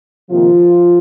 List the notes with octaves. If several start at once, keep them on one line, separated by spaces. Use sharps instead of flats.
C3 D#3 F3 A#3 F4